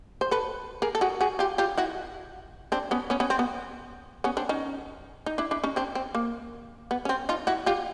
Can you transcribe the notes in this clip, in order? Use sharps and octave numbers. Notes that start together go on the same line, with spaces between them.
C5
A4 B4
G#4 A#4
A4
F#4 G#4
F#4 G#4
F4 G4
F4 G4
E4 F#4
C4 D4
B3 C#4
B3 C#4
B3 C#4
C4
B3
B3 C#4
C4 D4
C#4 D#4
D#4
D4 E4
D4 E4
C#4 D#4
C4 D4
C4
A#3
B3
C#4
C4
D#4 F4
E4 F#4
F4 G4